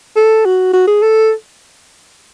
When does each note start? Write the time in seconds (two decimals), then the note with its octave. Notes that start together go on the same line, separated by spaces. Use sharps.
0.16 A4
0.45 F#4
0.73 F#4
0.87 G#4
1.02 A4